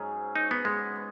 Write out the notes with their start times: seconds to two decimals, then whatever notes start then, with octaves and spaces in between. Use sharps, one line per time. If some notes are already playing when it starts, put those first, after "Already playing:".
Already playing: G#2 F#3 C#4 G#4
0.36 D#4
0.51 B3
0.65 G#3
0.96 B3